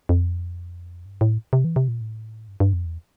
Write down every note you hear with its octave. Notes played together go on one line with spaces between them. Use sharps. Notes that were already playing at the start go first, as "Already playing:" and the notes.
F2
G2
A2
C3
E3
C3
A#2
A2
G2
G2
F2
E2